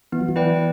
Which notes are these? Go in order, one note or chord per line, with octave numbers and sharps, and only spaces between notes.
E3 B3
F#3
E3
E4 B4 D5 G5